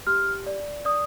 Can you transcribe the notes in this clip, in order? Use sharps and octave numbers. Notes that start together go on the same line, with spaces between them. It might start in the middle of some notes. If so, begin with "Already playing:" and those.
G4 F6
D5
D5 D#6